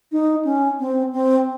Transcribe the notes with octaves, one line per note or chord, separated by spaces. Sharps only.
D#4
C#4
C4
C4